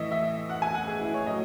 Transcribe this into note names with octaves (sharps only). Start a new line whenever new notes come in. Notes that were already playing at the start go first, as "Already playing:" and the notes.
Already playing: A2 E3 D#5 E5
E5
F#5
G#5
F#5
G#4
E4
C#5
A2 F#3 D#5